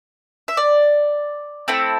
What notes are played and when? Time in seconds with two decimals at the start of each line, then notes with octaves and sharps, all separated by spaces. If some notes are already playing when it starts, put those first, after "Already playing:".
0.48 E5
0.57 D5
1.68 A3 C4 E4 A4